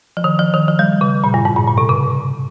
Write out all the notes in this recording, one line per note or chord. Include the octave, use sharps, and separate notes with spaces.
F3
D#3
F3
D#3
F3
G3
C#3
A#2
G2
G#2
A#2
A#2
C3
C#3